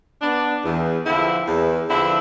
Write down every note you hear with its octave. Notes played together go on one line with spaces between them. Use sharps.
B3 D4
E2
D3 F3 C4 E4
E2
D3 F3 C4 E4